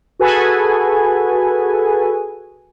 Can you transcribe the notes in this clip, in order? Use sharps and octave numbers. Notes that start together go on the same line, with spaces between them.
F#4 G#4 A4 B4 G#5